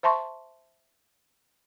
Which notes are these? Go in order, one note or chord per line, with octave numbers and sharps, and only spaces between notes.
C5 E5 A5 C6 C#6